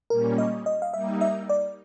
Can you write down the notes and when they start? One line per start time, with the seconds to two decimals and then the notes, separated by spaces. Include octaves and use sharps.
0.10 A#2 G3 A#3 C#4 A#4
0.38 D#5
0.66 D#5
0.82 F5
0.94 G3 A#3 D#4 E5
1.21 E5
1.49 D5